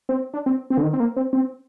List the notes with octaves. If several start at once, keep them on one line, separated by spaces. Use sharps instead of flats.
C4
D4
C4
C4
D3
D#3
C4
A#3
C4
C4